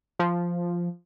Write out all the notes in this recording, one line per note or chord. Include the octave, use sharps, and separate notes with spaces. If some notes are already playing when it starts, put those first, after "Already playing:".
F3